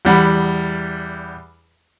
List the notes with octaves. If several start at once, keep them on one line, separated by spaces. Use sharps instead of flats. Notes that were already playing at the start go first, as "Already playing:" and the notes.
E2 G3 F#5 B5